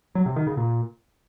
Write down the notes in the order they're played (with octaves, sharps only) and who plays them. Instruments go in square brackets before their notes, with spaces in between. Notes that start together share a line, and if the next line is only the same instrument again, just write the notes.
[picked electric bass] F#3
C3
D#3
C#3
A#2